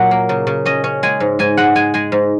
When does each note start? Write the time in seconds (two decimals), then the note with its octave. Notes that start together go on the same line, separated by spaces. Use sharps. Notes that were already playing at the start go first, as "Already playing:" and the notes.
Already playing: A#2 F#3 F#5
0.11 A#3
0.29 C#3
0.47 C#3
0.65 C#4 D#5
0.84 C#4
1.03 G#3 G#5
1.20 G#2
1.39 G#2 G#5
1.57 G#3 F#5
1.75 G#3 G#5
1.94 G#3 G#5
2.12 G#2